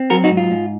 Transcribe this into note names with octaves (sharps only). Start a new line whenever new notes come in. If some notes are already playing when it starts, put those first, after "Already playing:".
Already playing: C4
F#3 F#4 A#4
D#4 F#4
G#2
F4
G#2